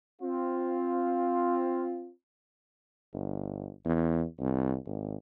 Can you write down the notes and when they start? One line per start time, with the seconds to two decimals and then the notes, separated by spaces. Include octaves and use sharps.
0.22 C4 F4
3.13 G1
3.85 E2
4.39 C2
4.86 G#1